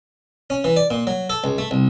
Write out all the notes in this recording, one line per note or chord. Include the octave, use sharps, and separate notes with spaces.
C#4
E3
D5
A#2
F#3
A4
C#2
A3
C2